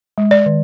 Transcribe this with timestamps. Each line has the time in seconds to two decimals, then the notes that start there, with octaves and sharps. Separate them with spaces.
0.18 G#3
0.31 D5
0.46 D#3